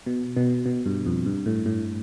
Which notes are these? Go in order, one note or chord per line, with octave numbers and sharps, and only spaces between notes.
B2
B2
B2
G2
F2
G2
A2
A2